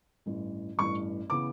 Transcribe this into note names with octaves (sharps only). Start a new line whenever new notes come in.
A1 G2 E3
A1 G2 E3 C#6
C#3 E3 B3 D6